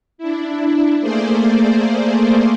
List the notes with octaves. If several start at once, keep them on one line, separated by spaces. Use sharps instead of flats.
D4 E4
A3 A#3 G#4 C5 D5